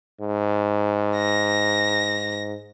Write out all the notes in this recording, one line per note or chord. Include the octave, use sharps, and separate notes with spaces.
G#2
A#6